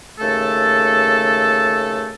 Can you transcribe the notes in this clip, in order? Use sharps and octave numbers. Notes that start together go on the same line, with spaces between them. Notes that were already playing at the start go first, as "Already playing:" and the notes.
D#2 C#3 A3 A4